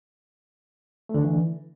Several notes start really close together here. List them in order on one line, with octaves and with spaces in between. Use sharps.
A3 D3 D4 E3